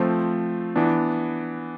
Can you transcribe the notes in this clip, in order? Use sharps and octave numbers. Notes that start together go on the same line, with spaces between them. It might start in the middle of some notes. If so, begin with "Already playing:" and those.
Already playing: F3 A3 C4
E3 B3 D4